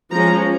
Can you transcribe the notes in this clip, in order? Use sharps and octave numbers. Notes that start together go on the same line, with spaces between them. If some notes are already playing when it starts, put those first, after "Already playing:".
F3 G#3 C#4 A#5